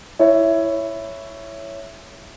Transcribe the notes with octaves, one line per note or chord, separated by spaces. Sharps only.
E4 C#5 E5